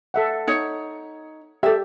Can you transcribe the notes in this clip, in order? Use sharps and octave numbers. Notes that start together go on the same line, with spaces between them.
A4 E5 F#5
D#4 C#5
G4 A4 E5